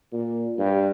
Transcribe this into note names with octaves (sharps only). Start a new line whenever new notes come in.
A#2
G2